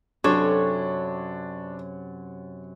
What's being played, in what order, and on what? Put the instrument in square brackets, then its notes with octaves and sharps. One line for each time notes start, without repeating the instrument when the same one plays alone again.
[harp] F#2 C3 [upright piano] D4 [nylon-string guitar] A4 [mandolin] C#5